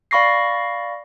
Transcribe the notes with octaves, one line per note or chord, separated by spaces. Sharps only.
D5 F5 B5 C#6 A#6 C7